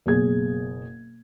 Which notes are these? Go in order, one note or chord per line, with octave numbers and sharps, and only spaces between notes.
F#1 B2 G#4 G#6